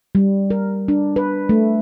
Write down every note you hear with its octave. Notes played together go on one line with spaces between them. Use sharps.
G3
A#4
D4
B4
A3